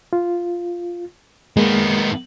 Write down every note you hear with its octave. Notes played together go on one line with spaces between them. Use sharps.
F4
D#3 G#3 A#3 B3